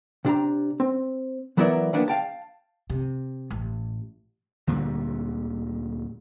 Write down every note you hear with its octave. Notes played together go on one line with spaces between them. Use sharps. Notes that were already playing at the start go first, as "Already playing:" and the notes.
C3 D4 G4 A#5
C4
E3 F#3 B3 E4 A#4 D5
D#3 F3 A#3 B3 D4
F5 G5 A5
C3
A1
D2 A#2 D3 G3